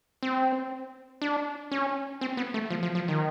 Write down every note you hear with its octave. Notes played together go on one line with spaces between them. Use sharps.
C4
D4
C#4
C4
B3
A3
F3
F3
F3
D#3